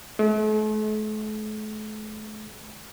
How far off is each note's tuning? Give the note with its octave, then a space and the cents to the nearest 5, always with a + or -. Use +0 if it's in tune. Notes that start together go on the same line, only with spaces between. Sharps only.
A3 -45